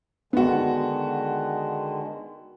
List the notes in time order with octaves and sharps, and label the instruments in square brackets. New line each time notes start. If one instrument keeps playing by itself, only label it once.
[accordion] D3 D#3 G#3 [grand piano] B3 F#4